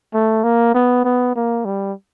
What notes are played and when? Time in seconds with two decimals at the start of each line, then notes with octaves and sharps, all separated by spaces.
0.14 A3
0.44 A#3
0.75 B3
1.04 B3
1.35 A#3
1.65 G3